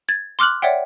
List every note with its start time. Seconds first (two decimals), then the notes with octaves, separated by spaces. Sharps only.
0.09 G#6 A6
0.39 C6 D6 F6 F#6 F#7
0.62 C#5 D5 E5 F#5 G5